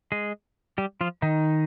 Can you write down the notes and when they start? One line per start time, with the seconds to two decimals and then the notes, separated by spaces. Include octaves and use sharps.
0.12 G#3 G#4
0.78 G3 G4
1.01 F3 F4
1.22 D#3 D#4